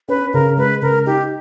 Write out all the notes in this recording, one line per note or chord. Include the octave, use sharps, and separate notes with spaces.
C#4 B4
C#3 A#4
G#3 B4
C#3 A#4
D#4 G4